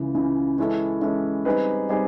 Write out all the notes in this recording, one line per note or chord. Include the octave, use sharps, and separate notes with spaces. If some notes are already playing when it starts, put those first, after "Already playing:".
Already playing: C#2 C#3 E3
C#2 C#3 E3
E3 G#3 C#4 E4 A4
E3 G#3 C#4 E4 A4
G3 C4 D#4 G#4 B4
G3 C4 D#4 G#4 B4